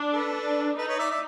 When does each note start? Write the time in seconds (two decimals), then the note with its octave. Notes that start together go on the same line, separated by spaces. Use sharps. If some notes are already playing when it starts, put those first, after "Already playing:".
Already playing: D4
0.13 A4 B4
0.35 D4
0.78 D#4 A4 B4
0.88 B4 C#5
0.99 D5 E5
1.11 D5 E5